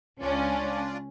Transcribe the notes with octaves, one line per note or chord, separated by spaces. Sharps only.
C#2 C#4 D4 F4 D5